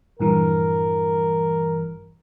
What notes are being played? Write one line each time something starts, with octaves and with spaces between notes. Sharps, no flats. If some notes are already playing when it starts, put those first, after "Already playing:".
A#1 G2 E3 A#4